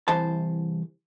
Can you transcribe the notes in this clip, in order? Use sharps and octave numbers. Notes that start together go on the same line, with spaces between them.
C2 E3 C5 A5